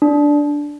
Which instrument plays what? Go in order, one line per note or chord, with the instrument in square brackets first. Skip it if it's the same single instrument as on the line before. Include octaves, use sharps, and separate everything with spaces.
[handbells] D4